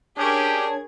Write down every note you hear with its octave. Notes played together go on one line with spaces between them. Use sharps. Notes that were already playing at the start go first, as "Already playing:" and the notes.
C#4 D4 G4 G#4 A#4 C#5 A5 G#6